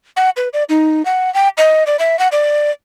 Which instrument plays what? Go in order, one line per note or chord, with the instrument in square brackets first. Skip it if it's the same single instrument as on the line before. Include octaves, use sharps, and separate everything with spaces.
[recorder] F#5
B4
D5
D#4
F#5
G5
D#5
D5
E5
F#5
D5